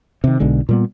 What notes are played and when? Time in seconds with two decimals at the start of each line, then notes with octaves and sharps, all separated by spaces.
0.24 C3 D#3
0.40 B1 B2 D3 G#3
0.69 A#2 G3 B3